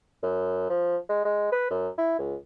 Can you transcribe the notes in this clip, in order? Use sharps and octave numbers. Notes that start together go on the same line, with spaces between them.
F#2
F3
G#3
G#3
B4
F#2
E4
C#2